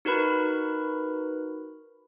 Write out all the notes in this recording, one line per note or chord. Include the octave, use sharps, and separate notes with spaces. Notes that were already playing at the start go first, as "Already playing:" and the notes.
D#4 F#4 A#4 B4 B5